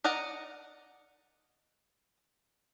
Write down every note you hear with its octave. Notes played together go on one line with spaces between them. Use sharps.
A#4 D5 D#5 F#5 A#5